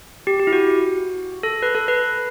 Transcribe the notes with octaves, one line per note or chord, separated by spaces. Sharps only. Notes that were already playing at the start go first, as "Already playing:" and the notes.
G4
G4
E4
F#4
A4
B4
A4
B4